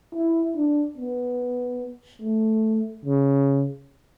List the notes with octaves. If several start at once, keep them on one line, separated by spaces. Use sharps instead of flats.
E4
D4
B3
A3
C#3